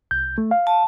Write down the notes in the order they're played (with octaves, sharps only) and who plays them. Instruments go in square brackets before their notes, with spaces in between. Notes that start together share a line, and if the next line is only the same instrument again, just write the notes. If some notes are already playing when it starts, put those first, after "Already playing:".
[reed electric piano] C2 G6
A3
F5
[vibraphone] A5